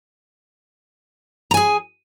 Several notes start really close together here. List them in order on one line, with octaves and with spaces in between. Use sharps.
A#5 G#5 G#4